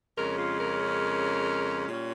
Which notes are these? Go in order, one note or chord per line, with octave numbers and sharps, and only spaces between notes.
F2 C#3 G#3 C#4 A#4
F4
A#4
A#4
A#2 G3 C#4 C#5